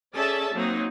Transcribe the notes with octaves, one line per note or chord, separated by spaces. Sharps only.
C#4 G#4 A4 D5 E5 A5
F#3 A#3 C4 D#4